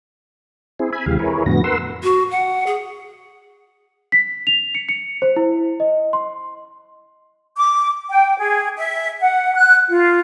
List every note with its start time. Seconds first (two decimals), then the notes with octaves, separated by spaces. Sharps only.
0.79 C4 E4 G#4
0.93 E5 G#5 B5
1.06 D#2 C3 E3 G#3 G4 F5
1.19 E4 G#4 A#4 B4 C#5
1.46 F2 A2 D3 B3 F#4 A#6
1.64 A#4 B4 F#5 C6 E6
2.03 F#4
2.31 F#5
2.67 G#4
4.12 B6
4.47 F7
4.75 C#7
4.89 C#7
5.22 C5
5.36 E4
5.80 D#5
6.13 C6
7.56 D6
8.10 G5
8.38 G#4
8.76 E5
9.20 F#5
9.55 F#6
9.89 F4